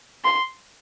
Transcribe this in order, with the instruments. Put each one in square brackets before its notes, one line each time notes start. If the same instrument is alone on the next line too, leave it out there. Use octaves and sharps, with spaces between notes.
[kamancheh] C6